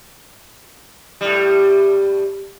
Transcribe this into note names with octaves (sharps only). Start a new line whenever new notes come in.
A2 G3